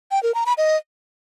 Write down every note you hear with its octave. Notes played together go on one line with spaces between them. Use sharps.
G5
A#4
A#5
B5
D#5